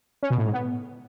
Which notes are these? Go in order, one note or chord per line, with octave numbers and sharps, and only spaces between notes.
C#4
B2
A2
G#2
B3